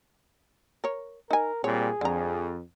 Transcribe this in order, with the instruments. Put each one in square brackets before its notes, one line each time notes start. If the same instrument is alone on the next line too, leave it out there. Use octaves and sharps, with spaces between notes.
[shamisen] A#4 C#5
[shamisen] D#4 G#5 [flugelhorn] A#4
[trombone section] A#2 G3 C4 [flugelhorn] G#4 [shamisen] C#5
[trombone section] F2 [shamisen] D3 A#5